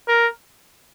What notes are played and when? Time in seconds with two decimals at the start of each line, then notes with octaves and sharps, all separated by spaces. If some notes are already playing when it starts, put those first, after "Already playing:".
0.08 A#4